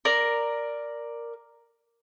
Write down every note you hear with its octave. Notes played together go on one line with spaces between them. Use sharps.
A#4 D5